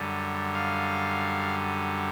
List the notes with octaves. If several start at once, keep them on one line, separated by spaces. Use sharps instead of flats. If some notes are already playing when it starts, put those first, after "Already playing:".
Already playing: F#2 D3 G3
F5